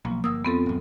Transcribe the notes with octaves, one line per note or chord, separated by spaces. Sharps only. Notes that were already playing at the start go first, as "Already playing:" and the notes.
B1 F3 A#3
G1 A#3 D#6 E6
F2 F3 B3 C4 A4
D#1 F#2